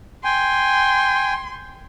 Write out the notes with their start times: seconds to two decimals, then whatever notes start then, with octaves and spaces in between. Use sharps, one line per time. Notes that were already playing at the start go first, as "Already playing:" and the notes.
0.24 G5 G#5 C6